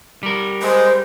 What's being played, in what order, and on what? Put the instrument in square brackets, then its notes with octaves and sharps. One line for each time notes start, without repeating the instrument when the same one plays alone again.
[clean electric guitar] G3 A#4
[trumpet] G#3 [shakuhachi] C5